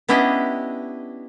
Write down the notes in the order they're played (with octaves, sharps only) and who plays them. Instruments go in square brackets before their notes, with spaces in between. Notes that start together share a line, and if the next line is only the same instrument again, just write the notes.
[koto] B3 C#4 D4 E4 G4 D#5